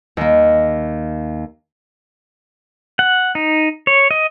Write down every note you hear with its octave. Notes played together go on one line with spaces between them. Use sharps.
D#2 A#3
F#5
D#4
C#5
D#5